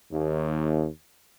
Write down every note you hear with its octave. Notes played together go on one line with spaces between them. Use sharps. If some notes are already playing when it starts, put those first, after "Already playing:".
D#2